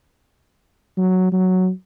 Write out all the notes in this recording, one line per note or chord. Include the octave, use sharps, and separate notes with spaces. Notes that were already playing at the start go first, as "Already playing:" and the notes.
F#3
F#3